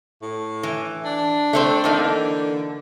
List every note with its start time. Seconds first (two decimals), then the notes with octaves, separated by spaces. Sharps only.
0.22 A2
0.63 E3
1.05 D4
1.53 A3 C4 C5
1.84 E3 A#3 D#4
2.02 D3